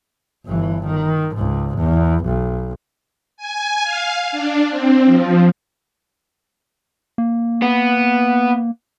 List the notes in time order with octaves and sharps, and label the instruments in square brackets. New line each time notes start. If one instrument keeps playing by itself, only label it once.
[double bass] G1 E3
D#3
C#2 G#2
E2
B1
[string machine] G#5
F5
D4
C4
F3
[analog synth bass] A#3
[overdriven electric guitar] B3